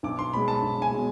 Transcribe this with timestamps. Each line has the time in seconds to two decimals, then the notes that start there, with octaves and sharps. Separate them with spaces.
0.03 B1 D6
0.19 C6
0.33 B2 G#3 B5
0.48 A5
0.62 B1
0.82 G#5
0.91 B2 G#3